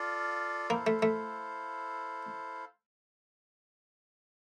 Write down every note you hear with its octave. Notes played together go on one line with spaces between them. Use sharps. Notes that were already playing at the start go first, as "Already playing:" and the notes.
Already playing: F4 A4 D5 F5
A#3 E4 A4 C5 F5
A3
A3